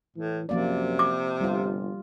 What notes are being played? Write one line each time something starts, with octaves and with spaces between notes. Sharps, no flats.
A2 E3
F#2 C3 F3 A#3 D5
D6
G1 G3 F4